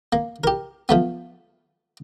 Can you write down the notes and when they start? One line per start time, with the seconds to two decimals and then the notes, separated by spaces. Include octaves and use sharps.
0.13 A#3
0.44 G4 A#4
0.89 F3 A3 B3